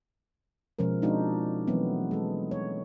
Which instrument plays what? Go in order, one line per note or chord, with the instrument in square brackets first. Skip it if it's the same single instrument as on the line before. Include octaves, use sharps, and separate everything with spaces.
[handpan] B2 F3 G#3 C#4 A#4
G#3 C4 D4 D#4 F4 F#4
E3 F#3 A3 B3 C4
G#3 A4
C#5